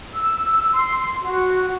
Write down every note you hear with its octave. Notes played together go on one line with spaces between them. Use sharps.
E6
C6
F#4